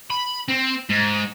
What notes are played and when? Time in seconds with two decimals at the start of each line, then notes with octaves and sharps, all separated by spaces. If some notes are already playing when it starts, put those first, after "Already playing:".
0.10 B5
0.48 C4
0.90 G#2